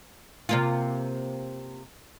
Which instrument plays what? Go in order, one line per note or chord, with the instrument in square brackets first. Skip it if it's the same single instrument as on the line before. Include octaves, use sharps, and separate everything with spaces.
[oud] C3 A#3 F4